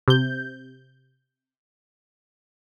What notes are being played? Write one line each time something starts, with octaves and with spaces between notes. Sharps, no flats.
C3 G6